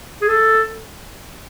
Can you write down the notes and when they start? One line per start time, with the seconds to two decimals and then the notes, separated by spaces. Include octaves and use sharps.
0.21 G#4
0.28 A4